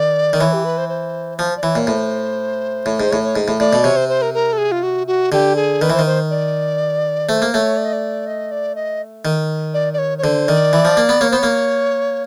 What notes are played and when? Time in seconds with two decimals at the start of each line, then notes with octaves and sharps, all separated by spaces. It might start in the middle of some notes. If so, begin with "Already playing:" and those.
Already playing: D#3 D5
0.33 D#3
0.40 E3 C#5
0.53 G4
0.65 B4
0.78 C5
0.89 C5
1.38 F3 C5
1.57 D5
1.63 E3 C#5
1.75 A#2
1.87 A2 C5
2.86 A2 C#5
2.99 G#2 C5
3.11 A2 C#5
3.24 C#5
3.36 G#2
3.48 A2
3.60 A2 D5
3.73 B2
3.84 C3 C#5
3.96 C5
4.09 C5
4.22 A#4
4.34 A#4
4.53 A4
4.58 G#4
4.72 F4
4.83 F#4
5.07 F#4
5.32 D3 G4
5.56 G#4
5.82 D#3 B4
5.90 E3 C5
5.99 D#3
6.06 C5
6.30 D5
7.29 A3 C5
7.42 A#3
7.54 A3 C#5
7.77 D5
7.85 D#5
7.93 D5
8.27 D#5
8.51 D5
8.76 D#5
9.25 D#3
9.74 D5
9.93 D5
9.98 C#5
10.18 C#5
10.23 D3 C5
10.48 D#3 D5
10.73 E3
10.85 F3
10.97 A#3
11.09 B3
11.21 A#3 C#5
11.31 B3 C5
11.39 A#3 C#5